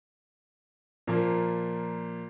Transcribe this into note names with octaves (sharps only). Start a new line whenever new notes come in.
A#2 F3 A#3